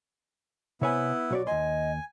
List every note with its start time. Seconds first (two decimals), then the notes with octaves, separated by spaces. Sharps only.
0.81 C3 B3 E4 C#5 G#5
1.31 B1 F#4 C#5 D5
1.47 D#2 D#5 G#5 C6